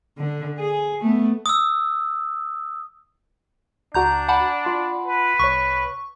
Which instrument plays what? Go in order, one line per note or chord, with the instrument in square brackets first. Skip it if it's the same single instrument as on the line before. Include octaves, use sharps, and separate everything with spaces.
[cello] D3
G#4
A3 B3
[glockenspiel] D#6 E6
[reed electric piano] C#2 F#4 [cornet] D4 [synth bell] A#5 G6
[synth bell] F#5 A5 B5
[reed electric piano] F4 C6
[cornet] B4
[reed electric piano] C2 C#5 [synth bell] C#6